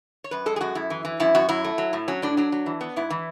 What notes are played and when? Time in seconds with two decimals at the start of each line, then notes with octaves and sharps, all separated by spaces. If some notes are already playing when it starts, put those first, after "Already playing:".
0.24 C#5
0.31 F#2 B4
0.46 G#3 A4
0.56 G#4
0.61 F#2 F#4
0.75 F#2 E4
0.90 E3
1.05 E3
1.20 F#2 E4
1.35 F#2 F#4
1.49 F#3 E4
1.64 A3
1.78 F#3
1.93 A2
2.08 F#3 C#4
2.22 A2 D4
2.37 F#3 D4
2.52 F#3
2.66 E3
2.81 B3
2.96 G#2 E4
3.10 E3